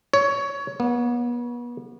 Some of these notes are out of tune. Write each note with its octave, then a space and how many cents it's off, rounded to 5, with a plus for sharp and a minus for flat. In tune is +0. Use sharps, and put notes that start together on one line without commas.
C#5 +15
B3 -35